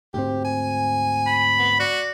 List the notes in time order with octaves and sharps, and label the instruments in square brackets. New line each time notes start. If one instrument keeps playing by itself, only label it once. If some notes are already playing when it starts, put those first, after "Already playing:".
[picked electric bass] D2 G#2 C4 [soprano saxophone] G4
[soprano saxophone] G#5
[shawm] B5
[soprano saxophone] B3
[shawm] F#4 [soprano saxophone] D5